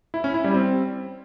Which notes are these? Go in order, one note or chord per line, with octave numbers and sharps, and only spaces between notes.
E4
C#4
E4
G3
C4